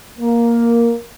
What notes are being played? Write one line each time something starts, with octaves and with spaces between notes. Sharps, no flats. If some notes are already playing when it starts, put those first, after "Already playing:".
A#3